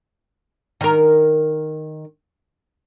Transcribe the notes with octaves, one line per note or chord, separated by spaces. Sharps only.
D#3 A#4